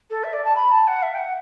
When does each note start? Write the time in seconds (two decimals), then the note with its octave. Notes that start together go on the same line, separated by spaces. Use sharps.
0.10 A4
0.24 E5
0.33 D5
0.44 A5
0.56 B5
0.72 A5
0.87 F#5
1.02 E5
1.14 G5
1.18 F#5